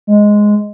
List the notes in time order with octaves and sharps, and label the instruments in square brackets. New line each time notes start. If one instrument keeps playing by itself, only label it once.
[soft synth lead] G#3